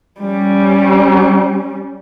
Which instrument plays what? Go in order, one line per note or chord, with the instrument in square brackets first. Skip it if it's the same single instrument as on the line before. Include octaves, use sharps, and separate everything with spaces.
[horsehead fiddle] G3 C#4